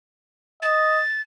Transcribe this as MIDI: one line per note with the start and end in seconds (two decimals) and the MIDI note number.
0.62 1.01 75
0.62 1.21 93